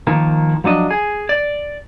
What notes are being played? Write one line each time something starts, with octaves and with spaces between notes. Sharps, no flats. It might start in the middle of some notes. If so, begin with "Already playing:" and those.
D#3 F3 A#3
F3 F#3 D4 D#5
G#4
D5